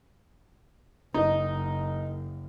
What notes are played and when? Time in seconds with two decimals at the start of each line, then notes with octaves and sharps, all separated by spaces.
1.14 F#1 D#4 D#5